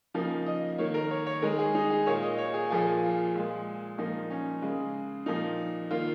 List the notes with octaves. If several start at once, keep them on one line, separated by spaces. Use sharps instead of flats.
C#3 F3 A#3 D#4
D#5
D#3 A#3 C#5
A#4
C#5
C#5
D#3 G#3 A#4
G#4
D#4
G#4
A#2 A#3 C#5
D#5
C#5
G#4
A#2 F3 A#3 G#4
F4
A#2 G#3
A#2 F3 A#3 D#4
C#4
C#3 G#3
A#2 F3 A#3 D#4
D#3 A#3 F4